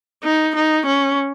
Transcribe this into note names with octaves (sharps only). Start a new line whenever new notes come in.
D#4
D#4
C#4